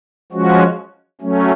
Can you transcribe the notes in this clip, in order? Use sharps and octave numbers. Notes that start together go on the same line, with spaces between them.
F3 G#3 C#4 F#4
F#3 A3 C#4